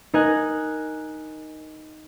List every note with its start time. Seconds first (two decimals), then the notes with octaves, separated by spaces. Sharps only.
0.14 D#4 A#4 G#5 F#6